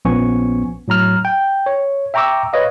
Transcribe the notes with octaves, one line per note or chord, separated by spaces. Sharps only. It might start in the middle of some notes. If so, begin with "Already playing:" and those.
A#1 F3 B3 C#4 G#5 C#6
A2 F#3 A#5 F6
G5
C#5
E5 G5 A#5 C#6 D6 E6
B4 C#5 D#5 F5